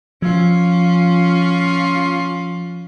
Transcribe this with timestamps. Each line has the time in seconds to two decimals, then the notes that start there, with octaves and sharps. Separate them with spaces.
0.22 F3 C#4 F4